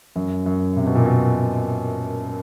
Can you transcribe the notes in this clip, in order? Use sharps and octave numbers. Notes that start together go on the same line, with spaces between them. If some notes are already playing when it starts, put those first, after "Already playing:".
F#2
F#2
C3
B2
A#2
B2